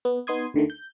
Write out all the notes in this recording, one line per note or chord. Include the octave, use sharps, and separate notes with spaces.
B3
B3 D#4 C6 D#6 G#6
D2 D3 D#3 A3
G6